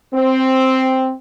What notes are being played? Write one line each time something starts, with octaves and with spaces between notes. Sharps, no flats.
C4